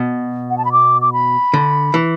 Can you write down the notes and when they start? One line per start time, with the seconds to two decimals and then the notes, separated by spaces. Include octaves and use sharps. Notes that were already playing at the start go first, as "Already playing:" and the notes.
Already playing: B2
0.50 F#5
0.58 A5
0.65 B5
0.72 D6
1.02 D6
1.13 B5
1.54 D3
1.94 E3